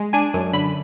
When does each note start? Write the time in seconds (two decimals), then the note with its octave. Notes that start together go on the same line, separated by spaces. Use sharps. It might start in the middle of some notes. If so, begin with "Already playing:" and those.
Already playing: G#3
0.13 D4 G#5
0.34 F#2
0.53 D3 B5